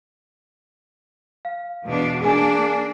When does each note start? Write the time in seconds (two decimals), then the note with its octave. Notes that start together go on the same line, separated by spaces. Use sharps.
1.45 F5
1.85 E2 B2 D4
2.21 A#3 D4 G#4 G#5